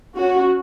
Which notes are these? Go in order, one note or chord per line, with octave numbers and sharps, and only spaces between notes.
C#4 F#4